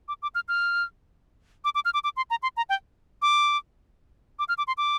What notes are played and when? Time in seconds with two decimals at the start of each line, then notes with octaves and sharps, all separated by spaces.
0.08 D6
0.22 D6
0.35 F6
0.48 F6
1.65 D6
1.75 D6
1.85 F6
1.94 D6
2.04 D6
2.17 C6
2.30 A#5
2.43 C6
2.57 A#5
2.69 G5
3.22 D6
4.39 D6
4.49 F6
4.58 D6
4.67 C6
4.78 D6